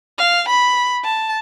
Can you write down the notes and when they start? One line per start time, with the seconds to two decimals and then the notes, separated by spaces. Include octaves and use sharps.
0.18 F5
0.49 B5
1.04 A5